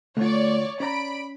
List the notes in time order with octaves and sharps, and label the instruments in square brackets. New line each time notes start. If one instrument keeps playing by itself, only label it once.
[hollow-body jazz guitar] D2 F4 [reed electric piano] A3 [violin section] C#5 D5
[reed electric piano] C#4 [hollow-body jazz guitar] C#5 D5 A#5 [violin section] B5 D7